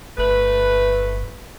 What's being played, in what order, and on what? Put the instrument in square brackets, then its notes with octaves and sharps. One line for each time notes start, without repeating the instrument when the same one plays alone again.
[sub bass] G1 [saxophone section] A3 B4